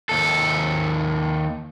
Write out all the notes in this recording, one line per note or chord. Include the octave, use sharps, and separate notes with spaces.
D#2 A4